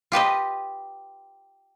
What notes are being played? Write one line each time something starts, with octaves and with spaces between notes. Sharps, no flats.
F4 G4 B4 D#5